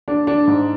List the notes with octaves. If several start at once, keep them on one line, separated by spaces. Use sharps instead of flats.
D4
D4
G#2